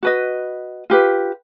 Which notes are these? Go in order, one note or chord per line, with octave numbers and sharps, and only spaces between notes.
F#4 B4 D#5
F4 G4 B4